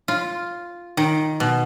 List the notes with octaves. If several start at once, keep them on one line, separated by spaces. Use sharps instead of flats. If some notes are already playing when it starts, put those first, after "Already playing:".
F4
D#3
B2